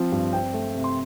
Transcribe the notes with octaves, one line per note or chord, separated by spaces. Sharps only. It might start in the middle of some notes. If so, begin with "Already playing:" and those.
Already playing: F3 C4
G2
C4 G5
A3
C3
C6